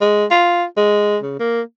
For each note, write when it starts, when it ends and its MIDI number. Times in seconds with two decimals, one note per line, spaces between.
0.01 0.25 56
0.31 0.64 65
0.77 1.17 56
1.23 1.36 49
1.40 1.61 58